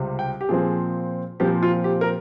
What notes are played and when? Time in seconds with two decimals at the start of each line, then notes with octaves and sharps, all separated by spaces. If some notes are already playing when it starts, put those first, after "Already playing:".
Already playing: C#2 C3 G3 C4
0.19 G5
0.41 G4
0.49 A#2 F3 C4 G#4
1.40 A#2 F3 C4 G4
1.63 F4
1.84 G4
2.01 A#4